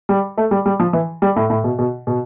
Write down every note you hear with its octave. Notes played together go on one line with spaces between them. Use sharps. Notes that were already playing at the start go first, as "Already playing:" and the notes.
G3
A3
G3
G3
F3
E3
G3
A2
A2
B2
B2
B2